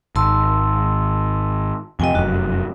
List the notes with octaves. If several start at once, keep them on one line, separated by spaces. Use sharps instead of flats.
G#1 A5 C6 E6
F2 C3 D#5 G5 G#5
F1 F#2 F#4